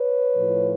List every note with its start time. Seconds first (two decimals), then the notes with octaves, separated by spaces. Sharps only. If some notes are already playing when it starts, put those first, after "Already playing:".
Already playing: B4 C#5
0.36 A2 F3